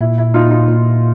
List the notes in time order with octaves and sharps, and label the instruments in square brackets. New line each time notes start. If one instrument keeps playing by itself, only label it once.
[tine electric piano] A#2 [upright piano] E4
[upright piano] E4
[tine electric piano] A#2 [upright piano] D#4 F4
[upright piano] D#4 F4
[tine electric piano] A#2